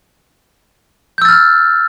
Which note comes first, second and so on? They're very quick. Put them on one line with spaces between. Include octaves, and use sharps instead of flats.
G6 E6 A6 F6